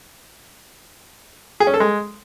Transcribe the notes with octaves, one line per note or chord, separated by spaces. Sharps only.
G#4
C#4
A4
G#3